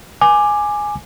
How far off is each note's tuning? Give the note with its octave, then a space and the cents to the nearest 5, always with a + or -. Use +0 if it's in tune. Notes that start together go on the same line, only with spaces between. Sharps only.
G#5 +0 D6 +15